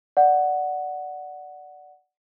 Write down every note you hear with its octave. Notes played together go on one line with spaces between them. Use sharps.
D5 F#5